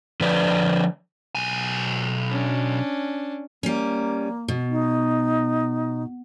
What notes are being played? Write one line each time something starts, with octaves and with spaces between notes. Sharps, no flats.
D3 F3 B4 D5
B1 G#5
C#4 D4
G3 A#3 C#4
B2
D#4